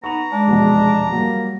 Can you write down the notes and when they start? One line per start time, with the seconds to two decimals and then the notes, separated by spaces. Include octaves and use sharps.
0.04 B3 D#4 A#5 C#6 F7
0.32 G#3 D4
0.48 F1 E2 B2
1.12 F#3 G3 A#3